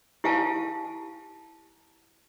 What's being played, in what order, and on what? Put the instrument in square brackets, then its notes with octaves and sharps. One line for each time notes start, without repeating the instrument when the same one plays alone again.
[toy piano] E4 G4 F5 G#5 A5